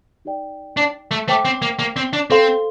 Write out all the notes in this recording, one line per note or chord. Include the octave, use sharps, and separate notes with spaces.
D#4 G4 D5 G5
D4
A3
A3 C5 G5 D6
C4
A#3
A#3
C4
D4
C4 A4 C5 F5 C6